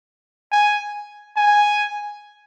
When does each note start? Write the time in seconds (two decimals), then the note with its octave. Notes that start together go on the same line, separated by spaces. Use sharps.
0.52 G#5
1.37 G#5